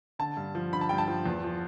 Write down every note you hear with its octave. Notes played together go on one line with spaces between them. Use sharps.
D3 A5
G2
F3
D3 B5
A5
G2 G5
A5
F3
E2
F3